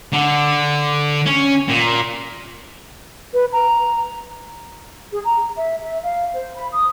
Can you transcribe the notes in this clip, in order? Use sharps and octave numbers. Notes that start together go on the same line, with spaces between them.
D3
C#4
A#2
B4
A#5
G#4
A#5
E5
E5
F5
C5
B5
D#6